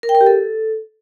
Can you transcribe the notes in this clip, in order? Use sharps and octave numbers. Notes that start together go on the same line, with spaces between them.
A#4
G5
A#4
G4
A4